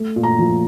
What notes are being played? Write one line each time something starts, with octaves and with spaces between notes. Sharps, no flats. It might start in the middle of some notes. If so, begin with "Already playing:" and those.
Already playing: A3
A#2
A#5
F3